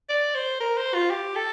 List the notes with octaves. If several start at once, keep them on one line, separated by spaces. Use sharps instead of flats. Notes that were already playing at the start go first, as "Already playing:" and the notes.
D5
C5
A#4
C5
F4
G4
A4